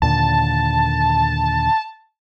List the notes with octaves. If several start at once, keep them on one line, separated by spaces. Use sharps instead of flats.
D#2 A#2 D3 A5